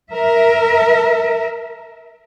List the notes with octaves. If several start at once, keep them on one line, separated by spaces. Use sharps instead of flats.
A#4 E5